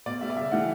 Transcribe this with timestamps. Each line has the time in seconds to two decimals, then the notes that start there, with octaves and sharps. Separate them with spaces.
0.06 B2 D5
0.21 G3 E5
0.30 D5
0.36 C#3 E5
0.52 E3 G3 F#5